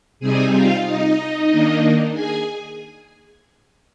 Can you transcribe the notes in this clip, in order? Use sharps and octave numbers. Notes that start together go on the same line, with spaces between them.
C3 G3 C4 D#4 G#4 G#5
F4 F5
D#4 D#5
D#3 A#3 D4
G#4 G#5